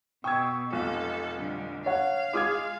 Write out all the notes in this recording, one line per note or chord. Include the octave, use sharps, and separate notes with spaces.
B2 G5 C#6 D#6 E6 G#6
F1 B1 F4 A4
D3 G3
C#5 F5 F#5
G#3 F4 G#4 D6 D#6 G#6